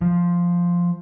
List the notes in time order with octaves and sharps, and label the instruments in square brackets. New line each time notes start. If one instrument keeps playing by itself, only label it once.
[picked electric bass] F3